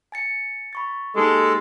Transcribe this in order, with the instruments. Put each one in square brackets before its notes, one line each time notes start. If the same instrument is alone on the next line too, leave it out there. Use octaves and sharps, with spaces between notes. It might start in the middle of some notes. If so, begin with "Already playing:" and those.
[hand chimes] G#5 A6 C#7
B5 C#6 A6
[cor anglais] G#3 [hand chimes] A#3 D#4 G4 [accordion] A4